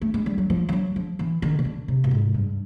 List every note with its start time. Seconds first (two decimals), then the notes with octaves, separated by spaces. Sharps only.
0.01 A3
0.14 G#3
0.26 G3
0.38 F#3
0.50 F3
0.69 F3
0.73 F#3
0.96 F3
1.19 E3
1.42 D#3
1.59 C#3
1.65 D3
1.88 C3
2.04 A2
2.11 G#2
2.34 G2